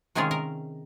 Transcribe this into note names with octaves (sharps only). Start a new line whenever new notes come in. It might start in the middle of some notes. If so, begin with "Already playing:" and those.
C3 D#3 G#3 C#4 F4 G#4
A#4